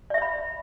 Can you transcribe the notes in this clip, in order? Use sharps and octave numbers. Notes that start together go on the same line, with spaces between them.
C#5 D5 E5 B5